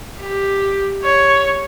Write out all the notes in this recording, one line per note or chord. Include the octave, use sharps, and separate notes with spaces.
G4
C#5